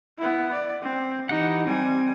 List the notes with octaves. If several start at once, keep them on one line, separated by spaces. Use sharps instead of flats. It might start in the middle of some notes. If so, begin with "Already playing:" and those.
B3 E4
D5
C4
E3 D#4 G4 F#5
G3 C4 G#5